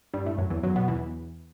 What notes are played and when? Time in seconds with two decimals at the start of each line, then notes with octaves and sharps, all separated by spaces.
0.14 G2 G3
0.25 A2 A3
0.38 F#2 F#3
0.50 E2 E3
0.63 F#2 F#3
0.76 B2 B3
0.88 E2 E3